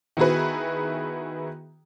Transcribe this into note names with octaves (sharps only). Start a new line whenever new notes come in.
D#3 B3 E4 F#4 G#4 B4